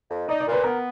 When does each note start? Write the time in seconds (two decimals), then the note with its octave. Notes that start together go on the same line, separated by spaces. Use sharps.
0.10 F2
0.28 D#4 D5
0.40 D5
0.47 A#2 B4
0.64 B3 A#4